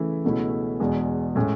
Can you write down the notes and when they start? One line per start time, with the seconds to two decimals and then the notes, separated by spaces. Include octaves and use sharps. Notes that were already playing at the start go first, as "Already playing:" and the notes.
Already playing: C#3 E3 A3 E4
0.24 C#2 B2 A3 C#4 E4
0.80 E2 B2 G#3 D4
1.36 A2 G#3 C#4